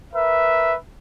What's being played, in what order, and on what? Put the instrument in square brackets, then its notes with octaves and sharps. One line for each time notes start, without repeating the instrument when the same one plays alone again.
[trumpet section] A#4 B4 E5